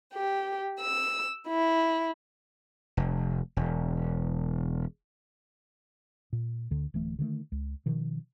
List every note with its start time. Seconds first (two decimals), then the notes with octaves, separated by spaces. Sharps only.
0.14 G4
0.80 E6
1.48 E4
2.97 F1
3.57 E1
6.33 A#2
6.71 D2 D3
6.94 D1 E3 A3
7.19 D3 D#3 F#3 A3
7.52 C#2
7.86 B2 D#3 F3